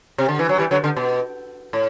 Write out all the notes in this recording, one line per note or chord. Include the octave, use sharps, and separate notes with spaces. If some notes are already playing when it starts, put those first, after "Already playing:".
C3
D3
E3
F#3
E3 G3
D3 F#3
D3
B2
A2